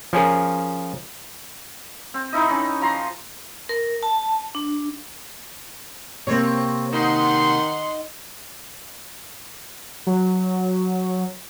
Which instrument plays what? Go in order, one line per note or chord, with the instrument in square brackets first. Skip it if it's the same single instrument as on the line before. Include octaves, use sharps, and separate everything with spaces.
[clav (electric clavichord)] F3 C#4 G#4 A#4
[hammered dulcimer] C4
D#3 D#4 E4 D#5
C#4
F3 A#5 C6
[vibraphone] A#4
A5
D4
[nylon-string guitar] C3 A#3 [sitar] C4 C#5
[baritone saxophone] D#3 [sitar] D#4 [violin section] F#5 C6
[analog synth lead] F#3